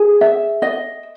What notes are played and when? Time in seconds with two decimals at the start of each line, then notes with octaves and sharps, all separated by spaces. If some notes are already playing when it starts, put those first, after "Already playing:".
Already playing: G#4
0.21 E5
0.62 D#5